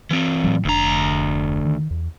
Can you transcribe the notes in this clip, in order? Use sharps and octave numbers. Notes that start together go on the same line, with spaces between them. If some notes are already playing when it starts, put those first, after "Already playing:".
E3 C4
A2 F#3
F1 D2 D4 A#5
D#3
E2